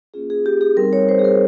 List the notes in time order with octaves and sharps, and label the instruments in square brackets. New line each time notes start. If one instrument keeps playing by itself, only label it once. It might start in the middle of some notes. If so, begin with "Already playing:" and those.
[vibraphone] A#3 C#4 F4 G#4
G#4
G4
G#4
G3 C4 D#4 A#4
C#5
C5
G#4
A#4